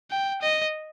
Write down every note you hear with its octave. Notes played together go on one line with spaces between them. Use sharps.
G5
D#5